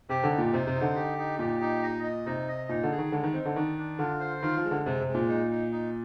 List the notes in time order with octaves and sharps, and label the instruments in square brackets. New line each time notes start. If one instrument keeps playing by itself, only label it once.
[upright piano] C3 [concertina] G4
[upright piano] D3
[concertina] D#4
[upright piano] A#2
[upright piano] C3 [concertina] C5
[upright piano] C3
[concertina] D#4
[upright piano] D3
[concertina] G4
D#4
[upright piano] A#2 [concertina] G4
[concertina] D#4
D#5
D#5
[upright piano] C3 [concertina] D#4
[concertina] D#5
[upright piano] A#2 [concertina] D#4
[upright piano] D3
[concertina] G#4
[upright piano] D#3
[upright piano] D3 [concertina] G#3
[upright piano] D#3
[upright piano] C4 [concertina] D#4
[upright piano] D3
[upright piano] D#3 [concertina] D4
[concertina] D4
[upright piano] D3 [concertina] F4
[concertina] C5
[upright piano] D#3 [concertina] F4
[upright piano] F3
[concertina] G#3
[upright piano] D3
[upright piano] C3 [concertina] G#3
[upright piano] C3
[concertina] G#3
[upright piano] A#2
[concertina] D#4
D#4
D#4